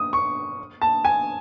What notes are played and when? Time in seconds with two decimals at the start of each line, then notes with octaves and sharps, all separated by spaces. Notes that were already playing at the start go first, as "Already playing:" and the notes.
Already playing: D#6
0.13 C#6
0.82 A5
1.05 G#5